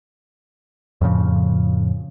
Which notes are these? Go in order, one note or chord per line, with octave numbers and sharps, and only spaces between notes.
F2 A2 C#3 F3